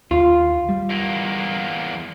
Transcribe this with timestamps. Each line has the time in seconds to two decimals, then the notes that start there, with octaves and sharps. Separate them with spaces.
0.11 D#2 F4
0.69 G3
0.90 E2 A#3